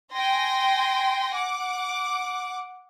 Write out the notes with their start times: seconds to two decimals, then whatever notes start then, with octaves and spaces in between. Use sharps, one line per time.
0.14 G5 G#5 C6 A#6
1.33 F#5 D6